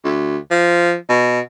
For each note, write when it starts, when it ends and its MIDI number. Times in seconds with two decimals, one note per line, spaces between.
0.05 0.37 38
0.51 0.95 53
1.09 1.40 47